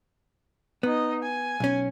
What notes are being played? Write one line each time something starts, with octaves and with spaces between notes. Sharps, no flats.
B3 D#4 D#5
G#5
B1 C#4